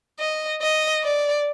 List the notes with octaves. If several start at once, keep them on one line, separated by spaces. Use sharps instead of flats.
D#5
D#5
D5